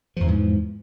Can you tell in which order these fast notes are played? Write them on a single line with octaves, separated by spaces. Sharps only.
F3 E2 E3 G#2